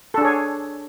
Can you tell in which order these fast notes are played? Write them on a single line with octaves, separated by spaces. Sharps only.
A4 D4 G#4 C#5